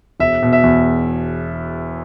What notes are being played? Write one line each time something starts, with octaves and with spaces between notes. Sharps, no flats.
E1 E5
B2
E5
E2